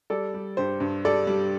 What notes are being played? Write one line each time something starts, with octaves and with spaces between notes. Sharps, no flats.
G3 A4 D5
G3
G2 G4 C5
G2
G3 A4 D5
G3